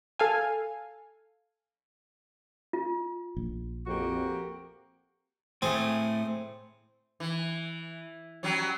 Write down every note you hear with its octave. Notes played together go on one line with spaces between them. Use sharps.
A4 F5 G#5
F4
A#1
F2 A#3 F#4 G4
A2 A3 C4 G#4
E3
F#3 G3 C#4